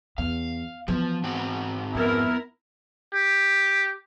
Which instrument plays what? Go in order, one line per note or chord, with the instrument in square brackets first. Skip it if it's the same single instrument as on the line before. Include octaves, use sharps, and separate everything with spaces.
[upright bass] E2 [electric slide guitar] F5
[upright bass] E3 B3 [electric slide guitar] F3
[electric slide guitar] G#2 C4 F#4
[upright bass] F2 [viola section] B3 E4 A#4
[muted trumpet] G4